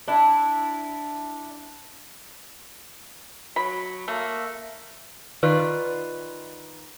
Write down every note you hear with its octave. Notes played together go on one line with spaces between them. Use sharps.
D4 E4
F#3 B5
A3 A#3
D#3 F4 B4 D5